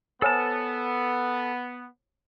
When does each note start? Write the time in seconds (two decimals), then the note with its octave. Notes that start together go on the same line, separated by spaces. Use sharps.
0.22 B3 A4 C5 C#5 G#5 A5